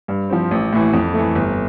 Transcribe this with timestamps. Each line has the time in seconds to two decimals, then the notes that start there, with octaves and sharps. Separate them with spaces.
0.08 G2
0.29 F3 C4
0.51 A1
0.73 A2 E3
0.93 F2
1.14 E3 A3
1.35 G1